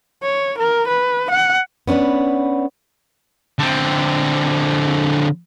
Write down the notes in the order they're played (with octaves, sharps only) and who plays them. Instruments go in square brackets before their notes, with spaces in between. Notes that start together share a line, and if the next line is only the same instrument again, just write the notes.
[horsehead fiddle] C#5
A#4
B4
F#5
[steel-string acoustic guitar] B3 C#4 D4 B4
[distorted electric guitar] D3 C4